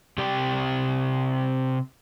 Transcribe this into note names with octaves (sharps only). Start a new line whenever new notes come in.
C3 G4 D5 G5